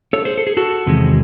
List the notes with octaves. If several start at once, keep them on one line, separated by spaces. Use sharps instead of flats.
A4 C#5
G#4 C5
A4
G#4
F#4 A4
E2 C3 D#3 G#3